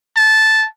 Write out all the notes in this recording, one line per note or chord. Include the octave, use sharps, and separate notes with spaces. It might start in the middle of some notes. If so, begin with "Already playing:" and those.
A5